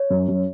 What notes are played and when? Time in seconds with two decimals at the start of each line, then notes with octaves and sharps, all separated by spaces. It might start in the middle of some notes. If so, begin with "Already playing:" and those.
Already playing: C#5
0.10 F#2
0.28 F#2